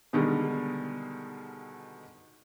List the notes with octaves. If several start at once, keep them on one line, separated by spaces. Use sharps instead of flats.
B2 D3 D#3 G3 G#3